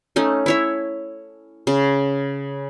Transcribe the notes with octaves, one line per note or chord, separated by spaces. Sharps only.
A3 C#4 D#4
E4 C#5 E5
C#3